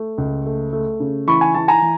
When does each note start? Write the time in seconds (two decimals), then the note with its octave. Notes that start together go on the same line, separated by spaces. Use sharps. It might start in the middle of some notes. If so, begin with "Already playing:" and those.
Already playing: A3
0.18 C#2
0.45 A3
0.73 A3
1.00 C#3
1.27 E3 B5 C#6
1.41 G#5
1.54 E3 A5
1.68 G#5 A#5
1.82 E3